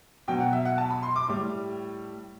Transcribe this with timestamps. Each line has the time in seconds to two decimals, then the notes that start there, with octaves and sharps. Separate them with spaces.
0.28 B2 F#3 G5
0.40 F#5
0.53 E5
0.65 F#5
0.78 A5
0.91 B5
1.03 C6
1.16 D6
1.28 A2 G3